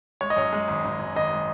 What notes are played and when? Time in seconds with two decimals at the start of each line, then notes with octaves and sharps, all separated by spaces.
0.21 G#3 C#5
0.30 D#5
0.36 F#2 C#5
0.53 G#3
0.68 G#1
0.85 G#1
0.99 F#2
1.16 G#1 D#5
1.31 G#3